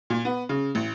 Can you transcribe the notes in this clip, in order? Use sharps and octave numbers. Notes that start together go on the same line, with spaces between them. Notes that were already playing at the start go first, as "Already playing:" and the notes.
A#2
B3
C#3
A1